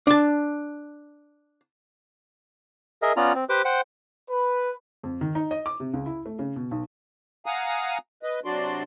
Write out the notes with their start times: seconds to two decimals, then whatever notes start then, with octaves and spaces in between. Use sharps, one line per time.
0.07 D4 A5
3.02 G#4 A#4 D#5 E5
3.17 B3 C#4 F4 D5 A#5
3.35 C4
3.49 G4 B4 C5 D6
3.65 C5 F#5 G5
4.30 B4
5.03 F2
5.21 D#3
5.35 D#4
5.51 D#5
5.66 D6
5.80 C3
5.94 C#2
6.06 E4
6.26 A3
6.39 C#3
6.56 B2
6.71 B1
7.46 F5 F#5 G#5 A#5 D#6
8.23 B4 D#5
8.45 C3 F#3 D4 F#4 D5 C6